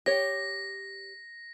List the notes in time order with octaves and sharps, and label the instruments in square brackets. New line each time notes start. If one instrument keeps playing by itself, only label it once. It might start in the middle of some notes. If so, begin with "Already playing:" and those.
[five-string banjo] G4 C#5 [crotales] A#6